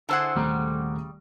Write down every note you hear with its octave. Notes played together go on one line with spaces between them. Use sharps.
D3 E4 G#4 A4 C5 F#5
D#1 C#3 G3 A3 A#5